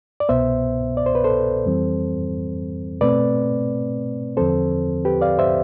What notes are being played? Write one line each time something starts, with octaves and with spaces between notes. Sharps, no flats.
D5
C2 B2 B3 C5 E5
D5
C5
B4
A4 C5
F2 E3 G3 C4
B2 A3 C4 B4 D5
E2 D3 F3 C4 A4 C5
G4 B4
D5 F5
C5 E5